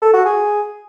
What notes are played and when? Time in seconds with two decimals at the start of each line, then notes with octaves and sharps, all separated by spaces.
0.02 A4
0.13 F#4
0.25 G#4